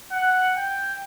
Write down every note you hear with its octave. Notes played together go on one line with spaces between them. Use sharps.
F#5
G5